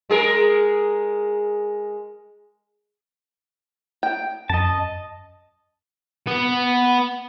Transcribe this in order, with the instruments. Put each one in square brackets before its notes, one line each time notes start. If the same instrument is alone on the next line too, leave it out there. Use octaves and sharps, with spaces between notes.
[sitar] G#3 G#4 A#4
[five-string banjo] G5
[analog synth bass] F#2 [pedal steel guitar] D#5 A5
[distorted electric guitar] B3